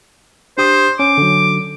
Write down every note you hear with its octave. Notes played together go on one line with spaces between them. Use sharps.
D4 G4 C5 D#6
C#4 D6
D3 F#3